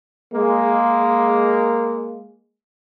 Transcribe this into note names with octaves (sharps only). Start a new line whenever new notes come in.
G#3 A#3